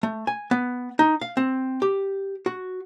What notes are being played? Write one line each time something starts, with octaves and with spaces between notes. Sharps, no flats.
A3
G#5
B3
D#4
F5
C4
G4
F#4